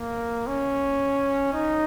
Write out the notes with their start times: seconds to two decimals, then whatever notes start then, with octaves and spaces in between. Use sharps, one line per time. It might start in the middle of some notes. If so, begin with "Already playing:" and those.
Already playing: A#3
0.47 C#4
1.54 D#4